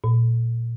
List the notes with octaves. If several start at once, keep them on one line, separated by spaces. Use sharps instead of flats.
A#2